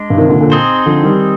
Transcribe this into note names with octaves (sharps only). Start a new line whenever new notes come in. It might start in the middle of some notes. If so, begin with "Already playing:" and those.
Already playing: G#3 D4
G2
C3 D#3
A#2 D3
A#2 D3
C4 D#4 G#4 C5
D3 F3
D#3 G3